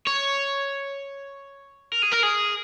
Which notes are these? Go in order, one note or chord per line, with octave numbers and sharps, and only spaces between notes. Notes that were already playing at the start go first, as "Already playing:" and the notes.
C#5
A#4
G#4
A#4
G#4